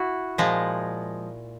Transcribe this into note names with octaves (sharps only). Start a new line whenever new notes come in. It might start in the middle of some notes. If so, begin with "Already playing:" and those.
Already playing: E4 F#4
A#2 F3 G#3